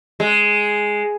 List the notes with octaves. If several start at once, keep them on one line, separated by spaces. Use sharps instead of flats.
G#3